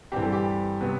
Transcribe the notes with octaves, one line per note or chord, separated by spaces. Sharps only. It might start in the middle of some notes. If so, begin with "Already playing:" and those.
G2 E3 G3 C4 G4
A4
G4
C3 F#3 B3